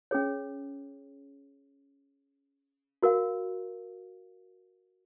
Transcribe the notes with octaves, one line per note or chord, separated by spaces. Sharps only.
C#4 G#4 C#5
F#4 A#4 F5